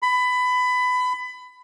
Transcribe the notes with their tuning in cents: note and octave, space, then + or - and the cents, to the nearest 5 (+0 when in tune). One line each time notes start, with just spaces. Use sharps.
B5 +20